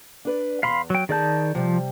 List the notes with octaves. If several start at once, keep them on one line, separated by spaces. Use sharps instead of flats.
D4 B4 D5
E2 C3 F5 B5 C6
F#3 G5
D#3 G#4 D5 A5 G6
C3 F3 G3